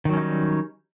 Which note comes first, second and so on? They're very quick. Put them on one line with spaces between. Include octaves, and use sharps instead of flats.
D#3 F#3 C#4 D#4 G3